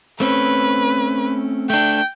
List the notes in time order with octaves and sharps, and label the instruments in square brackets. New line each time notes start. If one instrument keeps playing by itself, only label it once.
[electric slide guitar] A3 C4 C#4 [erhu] B4
[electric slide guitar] A3 D4 [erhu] G5